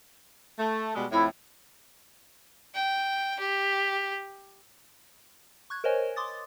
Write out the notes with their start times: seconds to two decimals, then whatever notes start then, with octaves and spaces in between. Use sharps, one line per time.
0.59 A3
0.96 B2 G3 G#3
1.12 F2 A2 E4
2.74 G5
3.40 G4
5.70 C#6 F#6 G#6
5.84 A#4 C5 C#5 D#5 G#5
6.16 C6 D6 D#6 A6